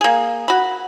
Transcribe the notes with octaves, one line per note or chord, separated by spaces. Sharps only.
A#3 G#4
F#4 B5